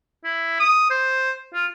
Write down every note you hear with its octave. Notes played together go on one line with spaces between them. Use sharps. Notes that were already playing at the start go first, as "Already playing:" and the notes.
E4
D#6
C5
F4